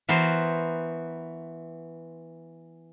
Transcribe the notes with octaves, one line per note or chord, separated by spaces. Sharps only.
E3 B3 F#4 A#4 C5